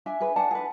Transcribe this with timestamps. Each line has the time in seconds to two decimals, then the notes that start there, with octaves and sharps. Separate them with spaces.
0.06 D4 E5 G#5
0.20 G#4 B4
0.36 D4 F#5 A5
0.51 G#4
0.55 B4